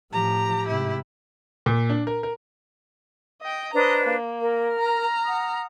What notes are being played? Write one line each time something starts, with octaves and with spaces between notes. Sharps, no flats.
A2 F3 G4 A#5
G#2 C3 E4
A#2
D4
A#4
A#4
D#5 G5
D4 B4 C5 D#5 A#5
A#3
A#4
A#5 F6
F#5 D#6